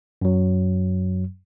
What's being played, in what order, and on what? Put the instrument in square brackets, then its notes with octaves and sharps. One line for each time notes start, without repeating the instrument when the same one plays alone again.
[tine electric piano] F#2 F#3